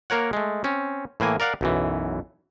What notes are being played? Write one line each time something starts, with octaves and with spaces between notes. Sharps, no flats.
A#3 A#4 C#5 F#5
G#3 A3
C4 C#4
A2 E3 A#3 G#5
A#4 D5 F5 F#5
B1 F#2 E3